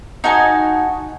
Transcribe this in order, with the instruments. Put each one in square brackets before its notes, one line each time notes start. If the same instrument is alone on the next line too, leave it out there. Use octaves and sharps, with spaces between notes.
[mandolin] D#4 F#4 G#5 A5